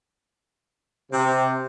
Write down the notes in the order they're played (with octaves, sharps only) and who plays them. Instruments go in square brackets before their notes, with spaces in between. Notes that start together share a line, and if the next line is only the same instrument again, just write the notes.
[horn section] C3